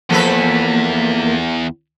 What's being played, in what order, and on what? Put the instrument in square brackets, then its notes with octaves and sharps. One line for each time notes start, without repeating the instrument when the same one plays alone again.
[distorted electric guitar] E2 [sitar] F3 A4 B4 [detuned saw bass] A#3